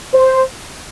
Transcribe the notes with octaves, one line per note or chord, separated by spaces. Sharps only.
C5